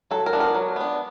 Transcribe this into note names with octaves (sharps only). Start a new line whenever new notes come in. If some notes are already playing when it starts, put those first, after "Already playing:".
F#3 A4
A#4
B3 D4
A#4
F#3
B3 D4